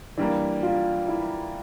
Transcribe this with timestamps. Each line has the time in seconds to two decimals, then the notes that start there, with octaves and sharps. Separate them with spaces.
0.17 E3 G3 A#3 D4
0.63 F4
1.08 E4